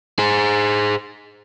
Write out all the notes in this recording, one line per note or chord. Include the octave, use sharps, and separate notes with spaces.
G#4 C5